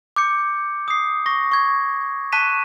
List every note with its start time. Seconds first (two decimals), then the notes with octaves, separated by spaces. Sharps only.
0.16 D6 G6 C#7
0.88 D#6 C7
1.26 C#6 A#6
1.52 C#6 G#6
2.32 A5 C#6 F#6 B6 D#7 E7